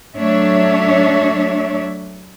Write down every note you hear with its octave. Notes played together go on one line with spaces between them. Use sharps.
F#3 A3 D4 C#5 E5